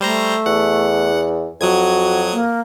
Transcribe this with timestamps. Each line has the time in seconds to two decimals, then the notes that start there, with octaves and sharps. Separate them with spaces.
0.01 G3 A3 C5 A#5
0.46 E2 F#5
1.61 F2 F#3 F#4 D#6 G#6
2.33 A#3